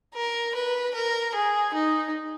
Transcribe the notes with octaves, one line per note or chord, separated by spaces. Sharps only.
A#4
B4
A#4
G#4
D#4